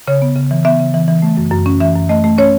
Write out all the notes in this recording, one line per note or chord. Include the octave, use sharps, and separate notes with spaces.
C#3 C#5
B3
C#3
E3
B3 E5
C#3
E3
E3
A3
F#2
F#2
C#4
E3 E5
F#2
A3 D#5
A3
C#4 C#5